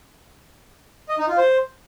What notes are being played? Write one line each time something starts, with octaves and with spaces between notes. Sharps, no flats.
D#5
D#4
F4
C5